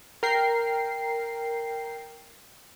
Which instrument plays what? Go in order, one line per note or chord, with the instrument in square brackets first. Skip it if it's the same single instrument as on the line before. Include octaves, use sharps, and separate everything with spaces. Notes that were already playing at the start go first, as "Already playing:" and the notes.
[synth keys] A#4 G5 C7